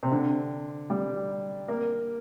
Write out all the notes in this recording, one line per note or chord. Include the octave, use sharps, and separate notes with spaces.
C3
D3
G3
A#3